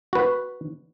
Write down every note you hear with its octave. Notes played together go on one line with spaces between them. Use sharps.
F#4 B4